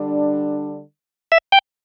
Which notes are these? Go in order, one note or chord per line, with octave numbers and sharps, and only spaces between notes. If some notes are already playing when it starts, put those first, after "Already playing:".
Already playing: D3 G3 D4
E5
G5